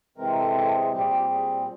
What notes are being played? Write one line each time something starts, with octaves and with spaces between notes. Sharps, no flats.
C3 E3 G#3 C4 A#4
A4
A4
G#4
A#2 G3 C4 G4
G#4
G4
G#4